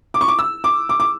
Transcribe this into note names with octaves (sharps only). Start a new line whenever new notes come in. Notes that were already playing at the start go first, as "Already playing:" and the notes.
D6
C#6
D6
E6
D6
D6
D6